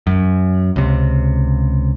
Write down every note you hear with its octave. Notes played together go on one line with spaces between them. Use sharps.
F#2
C#2 C3